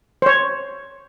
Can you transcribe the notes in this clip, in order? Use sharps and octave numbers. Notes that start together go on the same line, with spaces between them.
C5 C#5